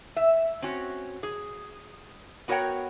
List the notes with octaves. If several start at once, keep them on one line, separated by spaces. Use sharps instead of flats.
E5
C4 C#4 F#4
G#4
B3 F#4 A#4 C#5 F#5 G5